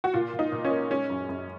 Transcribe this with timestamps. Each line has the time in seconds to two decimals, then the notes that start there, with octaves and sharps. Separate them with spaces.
0.04 F#4
0.14 A#2 F4
0.33 A#2
0.39 D#4
0.52 A#2
0.65 C#4
0.71 A#3
0.90 G#3 C#4
1.10 F#2
1.29 F#2